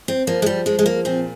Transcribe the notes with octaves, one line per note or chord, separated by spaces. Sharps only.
C4
F3 A#3
G#3
G3
F3 G#3
G#3
A#3
A#2 C4